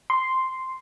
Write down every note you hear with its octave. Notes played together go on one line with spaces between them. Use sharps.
C6